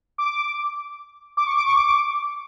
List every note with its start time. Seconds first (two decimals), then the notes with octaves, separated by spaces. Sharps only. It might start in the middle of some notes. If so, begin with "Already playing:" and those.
0.18 D6
1.37 D6
1.47 C#6
1.57 D6
1.66 C#6
1.76 D6